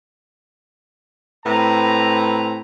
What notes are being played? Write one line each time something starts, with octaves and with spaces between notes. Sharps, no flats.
A2 C4 B4 A#5